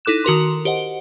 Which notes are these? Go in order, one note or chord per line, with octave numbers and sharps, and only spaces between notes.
D#4 E4 A4 D6 F#6 E7
D#3 F#4 A#4 C6
G4 C5 D#5 F#5